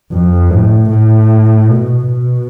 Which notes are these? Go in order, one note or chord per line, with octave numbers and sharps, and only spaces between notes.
F2
A2
A2
B2
B2